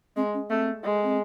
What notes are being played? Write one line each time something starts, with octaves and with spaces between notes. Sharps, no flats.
G#3 C4
C#4
A3 C4
G#3
C4